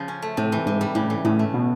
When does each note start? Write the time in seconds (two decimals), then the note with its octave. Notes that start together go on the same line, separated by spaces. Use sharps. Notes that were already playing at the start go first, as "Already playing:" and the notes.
Already playing: C#3 F3
0.08 C#4
0.22 A3
0.37 A2 C3
0.52 E3
0.66 G#2 C3
0.81 G3
0.95 A2 C#3
1.10 E3
1.24 A2 C#3
1.39 A3
1.54 B2